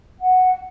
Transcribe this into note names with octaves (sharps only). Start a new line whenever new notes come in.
F#5